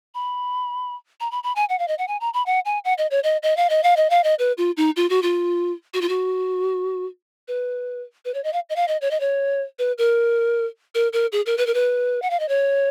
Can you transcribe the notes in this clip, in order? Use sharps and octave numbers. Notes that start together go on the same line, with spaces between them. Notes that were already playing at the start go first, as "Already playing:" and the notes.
B5
A#5
B5
B5
G#5
F#5
F5
D#5
F#5
G#5
A#5
B5
F#5
G#5
F#5
D#5
C#5
D#5
D#5
F5
D#5
F5
D#5
F5
D#5
B4
F4
D#4
F4
F#4
F4
F#4
F4
F#4
B4
B4
C#5
D#5
F5
D#5
F5
D#5
C#5
D#5
C#5
B4
A#4
A#4
A#4
G#4
A#4
B4
A#4
B4
F#5
F5
D#5
C#5